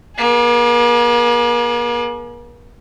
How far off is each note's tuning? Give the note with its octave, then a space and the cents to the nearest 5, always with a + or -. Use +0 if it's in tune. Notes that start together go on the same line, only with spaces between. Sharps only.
A#3 +45 G#4 +45